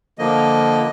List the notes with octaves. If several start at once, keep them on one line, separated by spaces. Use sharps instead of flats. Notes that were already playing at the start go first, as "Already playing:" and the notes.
D3 F3 A#3 D#5